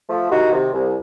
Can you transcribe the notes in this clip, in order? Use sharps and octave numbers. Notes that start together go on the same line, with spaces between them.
F3 A3
C2 D#4 F#4
C3 D#3
C2